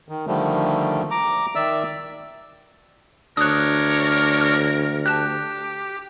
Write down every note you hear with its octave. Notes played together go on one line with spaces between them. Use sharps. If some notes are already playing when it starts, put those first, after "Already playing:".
D#3
D3 D#3 F3 G3 A3
A#5 D6
D#3 D5 E5 E6
D2 D4 A#4 C#5 D#6 F#6
F6
G4 A5 F#6